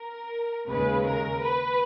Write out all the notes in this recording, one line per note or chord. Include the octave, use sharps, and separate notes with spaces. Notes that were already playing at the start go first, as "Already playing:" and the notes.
Already playing: A#4
D#2 C#3 G#3 B4
A#4
B4